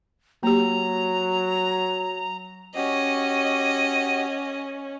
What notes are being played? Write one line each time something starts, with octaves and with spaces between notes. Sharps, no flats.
F#3 A#3 G4 A#5
C#4 F#4 G4 D#5